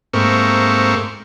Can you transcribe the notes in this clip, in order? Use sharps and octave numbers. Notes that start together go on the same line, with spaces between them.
G#2 A3 A#3 C4 C#6